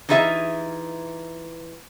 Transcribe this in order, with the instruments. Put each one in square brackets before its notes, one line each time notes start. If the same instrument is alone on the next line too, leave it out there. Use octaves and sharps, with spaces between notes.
[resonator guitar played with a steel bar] E3 D#4 F4 G#4 E5